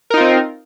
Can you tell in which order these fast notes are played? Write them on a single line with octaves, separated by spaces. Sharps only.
A#4 D#4 F4 C4